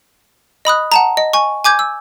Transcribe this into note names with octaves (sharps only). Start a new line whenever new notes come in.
D#5 B5 D#6 F#6
F#5 A5 A#5
D#5
G#5 C#6
G#5 D6 G6 G#6
E6